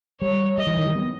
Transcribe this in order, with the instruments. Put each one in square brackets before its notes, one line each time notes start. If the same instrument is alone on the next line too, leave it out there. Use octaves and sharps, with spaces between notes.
[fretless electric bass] G3 [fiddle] C#5
[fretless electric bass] G3 [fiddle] D#5
[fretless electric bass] E3
D#3
G3
B3